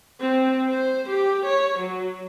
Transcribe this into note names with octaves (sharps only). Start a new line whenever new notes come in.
C4
C5
G4
C#5
F#3